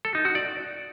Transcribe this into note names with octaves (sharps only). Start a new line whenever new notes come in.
A4
D#4
F#4
D5